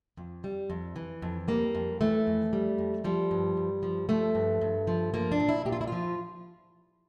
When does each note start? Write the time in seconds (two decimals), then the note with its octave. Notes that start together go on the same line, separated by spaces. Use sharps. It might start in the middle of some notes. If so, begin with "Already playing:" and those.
0.17 F2
0.44 G3
0.70 F2
0.96 E3
1.22 F2
1.48 G3 A#3
1.75 F2
2.01 E3 A3
2.27 F2
2.53 G3
2.78 F2
3.04 F3 G3
3.31 G2
3.57 G2
3.83 F3
4.09 F3 A3
4.35 G2
4.61 G2
4.87 F3
5.14 F3 A#3
5.32 D4
5.40 A#2
5.49 E4
5.65 A#2 G4
5.72 F4
5.81 E4
5.87 F3 F4